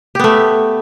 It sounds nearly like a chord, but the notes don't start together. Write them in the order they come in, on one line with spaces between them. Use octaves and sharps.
G4 B3 A3